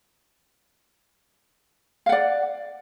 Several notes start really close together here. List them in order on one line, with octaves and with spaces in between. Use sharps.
F5 F#5 D5